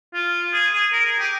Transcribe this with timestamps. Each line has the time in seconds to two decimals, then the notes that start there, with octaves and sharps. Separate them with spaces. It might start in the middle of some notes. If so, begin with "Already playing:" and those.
0.14 F4
0.53 G#4
0.73 G#4
0.93 A#4
1.06 G#4
1.19 G4